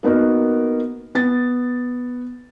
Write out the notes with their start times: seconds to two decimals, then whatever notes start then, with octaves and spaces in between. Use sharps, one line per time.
0.03 A#3 B3 D#4 F#4 A#4
1.15 B3 A6